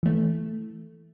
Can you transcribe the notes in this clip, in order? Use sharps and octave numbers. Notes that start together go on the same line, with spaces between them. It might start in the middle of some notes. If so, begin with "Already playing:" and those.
E3 A3